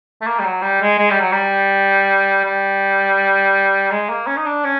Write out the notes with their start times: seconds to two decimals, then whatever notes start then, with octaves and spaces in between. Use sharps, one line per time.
0.21 A3
0.26 A#3
0.39 G3
0.44 F#3
0.62 G3
0.81 G#3
0.98 G#3
1.10 G3
1.21 F#3
1.32 G3
2.45 G3
3.91 G#3
4.09 A#3
4.27 C#4
4.37 D#4
4.46 D4
4.64 C#4